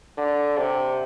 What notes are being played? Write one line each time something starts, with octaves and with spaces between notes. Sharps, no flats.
D3
C3